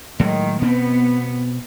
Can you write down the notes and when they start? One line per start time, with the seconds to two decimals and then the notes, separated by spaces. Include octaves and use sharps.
0.20 A2 D#3 F#3 G#3
0.62 B2 B3 C4